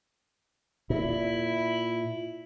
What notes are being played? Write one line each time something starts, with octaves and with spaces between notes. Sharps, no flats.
A#2 E4